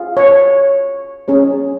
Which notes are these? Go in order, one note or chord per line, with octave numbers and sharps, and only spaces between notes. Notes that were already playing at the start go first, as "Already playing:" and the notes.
Already playing: F4 G#4
C#5
C#4 G#4 C#5